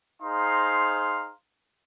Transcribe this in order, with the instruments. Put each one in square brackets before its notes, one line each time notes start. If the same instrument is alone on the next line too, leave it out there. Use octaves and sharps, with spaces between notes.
[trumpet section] D#4 G#4 C5 F5 A#5 C6